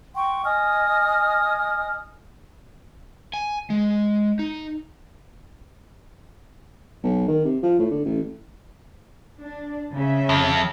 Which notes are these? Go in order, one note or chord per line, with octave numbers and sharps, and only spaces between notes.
F#5 G5 C6 C#6
D#5 G#5 D#6 F6
G#5
G#3
D#4
B1
D#3
C3
F3
A2
D3
A1
D4
C#3 E5
F2